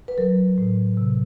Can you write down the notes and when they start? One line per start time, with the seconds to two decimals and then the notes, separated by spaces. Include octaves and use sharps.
0.08 B4
0.18 F#3 A#4
0.58 A2
0.97 C3